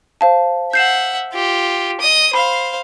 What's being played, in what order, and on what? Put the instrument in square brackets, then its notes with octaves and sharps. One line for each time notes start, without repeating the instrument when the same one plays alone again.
[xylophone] C5 F5 A5
[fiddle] E5 F#5 [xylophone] G6 C7 E7
[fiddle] F4 G4
D#5 D#6
[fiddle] C5 F5 [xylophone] B5